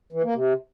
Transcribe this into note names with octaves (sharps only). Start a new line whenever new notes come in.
E3
A#3
C3